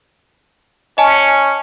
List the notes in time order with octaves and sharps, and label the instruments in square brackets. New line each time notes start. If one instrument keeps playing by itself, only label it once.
[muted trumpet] C#4 [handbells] D#5 G#5 A5